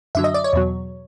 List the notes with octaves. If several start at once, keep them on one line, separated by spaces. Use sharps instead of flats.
F#2 D3 F#3 E5
D#5
D5
C#5
E2 B2 F#3